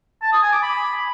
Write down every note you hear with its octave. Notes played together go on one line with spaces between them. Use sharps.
A5
D#6
G#5
D6
B5